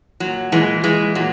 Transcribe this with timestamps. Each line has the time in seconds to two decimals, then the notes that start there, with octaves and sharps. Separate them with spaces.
0.20 A#2 F#3
0.52 A#2 E3 G#3
0.83 A#2 E3 G#3
1.15 A#2 F#3